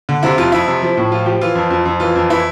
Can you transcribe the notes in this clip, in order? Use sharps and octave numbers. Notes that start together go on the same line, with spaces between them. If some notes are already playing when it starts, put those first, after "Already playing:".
D3
C3 E4
F2 F4
F2 E4
C3
F3
A2
F3 F4
F3 G4
E3 F4
F2
F2
F2
E3 F4
F2
E3 E4